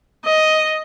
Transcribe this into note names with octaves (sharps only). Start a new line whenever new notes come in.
D#5